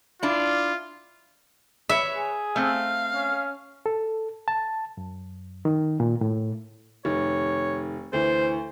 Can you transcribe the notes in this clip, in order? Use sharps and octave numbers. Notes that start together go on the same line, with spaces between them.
D4 E4 F4
B4 C#5 E5
G#4
A3 C4 F5
C#4
A4
A5
F#2
D#3
A#2
A2
F1 D#3 C#5
D2 E3 C5